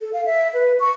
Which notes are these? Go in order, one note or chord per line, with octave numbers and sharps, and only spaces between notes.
A4
F5
E5
B4
C#6